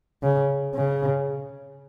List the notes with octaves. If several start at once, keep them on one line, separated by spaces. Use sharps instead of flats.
C#3
C#3